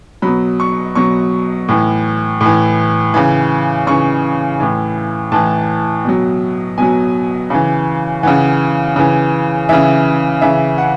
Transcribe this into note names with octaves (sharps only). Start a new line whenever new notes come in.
B2 F#3 B5
C#6
B2 F#3 C#6
A2 E3
A2
E3
C#3 E3
C#3 E3 C#6
A2 E3
A2 E3 A5
B2 F#3
B2 F#3 G#5
C#3 E3
C#3 E3 F#5
C#3 E3
C#3 E3 E5
C#3 E3 E5
F#5